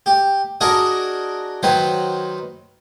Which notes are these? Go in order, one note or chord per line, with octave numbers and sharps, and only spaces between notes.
G4
D4 F#4 G#4 A#4 D#5
D#3 F#3 B4 C5